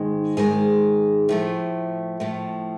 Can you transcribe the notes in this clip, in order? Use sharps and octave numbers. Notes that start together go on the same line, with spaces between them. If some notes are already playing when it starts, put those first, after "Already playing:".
Already playing: G#2 D#3 G#3
G#2 D#3 G#3 G#4
A2 F3 A3
A2 F3 A3